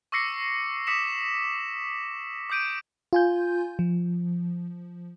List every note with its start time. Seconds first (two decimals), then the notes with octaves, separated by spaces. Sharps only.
0.12 C#6 D6 E6 A#6 C7 C#7
0.87 D6 D#6 B6 C#7 E7
2.50 D6 D#6 G6 D7 D#7
3.13 F4 G#5 G6
3.79 F3